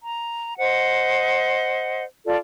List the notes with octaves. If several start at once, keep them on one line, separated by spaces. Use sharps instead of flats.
A#5
C5 D#5 F#5
F4 A4 D5